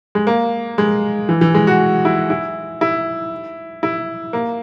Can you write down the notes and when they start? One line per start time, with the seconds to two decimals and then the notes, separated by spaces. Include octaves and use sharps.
0.15 G#3
0.27 A#3
0.78 G#3
1.29 E3
1.41 E3
1.54 G#3
1.67 F#4
2.05 E4
2.30 E4
2.81 E4
3.83 E4
4.33 A#3